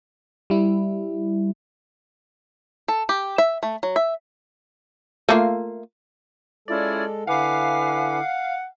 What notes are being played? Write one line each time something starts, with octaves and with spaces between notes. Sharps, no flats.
G3 E4
A4
G4
E5
A3
F#3
E5
A3 A#3 F4
G#3 C#4 E4 F4 A4 D5
D3 E4 B4 F5 F#5 G#5 D6